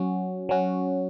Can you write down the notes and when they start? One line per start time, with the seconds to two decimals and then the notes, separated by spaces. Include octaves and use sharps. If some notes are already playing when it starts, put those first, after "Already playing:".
Already playing: F#3 C#4 F#4
0.49 F#3 C#4 F#4